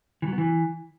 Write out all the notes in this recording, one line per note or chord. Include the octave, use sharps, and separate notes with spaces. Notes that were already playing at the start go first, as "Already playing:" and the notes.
E3
F#3
B3
E3